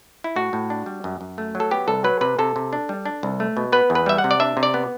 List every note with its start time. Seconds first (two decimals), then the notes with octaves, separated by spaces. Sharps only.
0.24 E4
0.36 A2 F#4
0.53 A2
0.70 D4
0.86 G3
1.04 F#2
1.21 F#2
1.38 A3
1.55 F#3
1.60 A4
1.71 B3 G4
1.88 C2 A4
2.04 F#3 B4
2.21 C3 B4
2.39 C3 A4
2.56 C3
2.73 D4
2.89 G3
3.05 D4
3.23 C2
3.40 A3
3.57 B2
3.72 B3 B4
3.90 E2
3.95 B4
4.06 G3 E5
4.18 F#5
4.24 C3
4.31 D5
4.40 D4 E5
4.57 C3
4.63 D5
4.74 B3